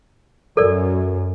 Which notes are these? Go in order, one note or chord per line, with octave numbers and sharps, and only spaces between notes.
F#2 A4 A#4 D5